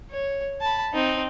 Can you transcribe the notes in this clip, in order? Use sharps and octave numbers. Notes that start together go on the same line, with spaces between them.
C#5
A5 B5
C4 D#4